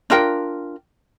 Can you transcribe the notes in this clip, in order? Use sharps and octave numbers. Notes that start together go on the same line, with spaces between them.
D4 F4 A#4 G5